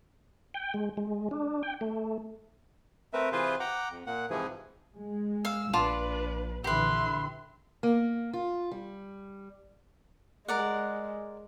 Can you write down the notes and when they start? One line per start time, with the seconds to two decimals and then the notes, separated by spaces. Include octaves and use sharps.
0.54 G5
0.74 G#3
0.97 G#3
1.31 D4
1.63 G5
1.81 A3
3.13 A3 C4 A#4 B4 E5
3.32 C3 E3 F4 G#4 B4 C5
3.60 F#5 G5 A#5 D6
3.91 F2
4.07 A#2 A#3 F#5
4.30 G#2 C3 E3 F3 G#4
4.95 G#3
5.45 F5 E6
5.73 A#1 D4 F4 B4 A5 D6
6.64 A#1 D3 E3 G4 B4 E5 C6
7.83 A#3
8.33 F4
8.71 G3
10.48 G#3 A#4 D5 F#5